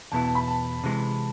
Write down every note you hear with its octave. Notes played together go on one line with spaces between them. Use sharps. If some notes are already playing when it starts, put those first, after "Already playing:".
E2 B2 B3 E4 A5
A5
B5
A5
C3 E3 G#3